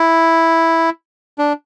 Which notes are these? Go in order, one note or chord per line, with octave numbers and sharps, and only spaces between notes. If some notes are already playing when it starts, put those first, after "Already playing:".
Already playing: E4
D4